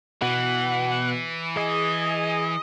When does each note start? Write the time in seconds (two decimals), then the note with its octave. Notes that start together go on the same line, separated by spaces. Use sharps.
0.22 B2 E3 F#5
1.57 G#4 D#5